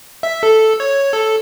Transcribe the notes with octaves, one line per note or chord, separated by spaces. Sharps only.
E5
A4
C#5
A4